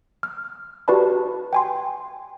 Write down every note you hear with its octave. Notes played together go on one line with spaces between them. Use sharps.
F6
F#4 G4 B4 D5 A5 B5
G5 G#5 C6